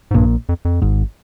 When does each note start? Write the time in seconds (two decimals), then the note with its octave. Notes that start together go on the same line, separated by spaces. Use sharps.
0.11 G#2
0.14 A#1 G2 A#2
0.49 F2
0.65 F2
0.82 G#1 G#2